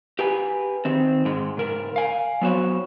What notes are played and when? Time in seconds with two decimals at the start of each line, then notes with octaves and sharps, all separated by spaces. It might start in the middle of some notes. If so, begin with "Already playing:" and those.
0.19 G4 B4 G#5
0.85 D#3 C4
1.25 G#2 G#3
1.57 G#2 C#3 A#4
1.96 F5 G#5
2.42 F#3 B3 F#4 C5 C#5